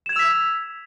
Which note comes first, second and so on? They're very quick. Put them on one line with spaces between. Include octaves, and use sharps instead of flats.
E7 G#6 F7 E6 B6